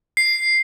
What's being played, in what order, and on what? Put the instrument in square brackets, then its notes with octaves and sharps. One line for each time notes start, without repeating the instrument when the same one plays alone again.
[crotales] C7